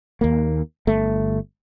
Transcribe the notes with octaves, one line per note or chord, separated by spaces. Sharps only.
D#2 A#3
G1 A3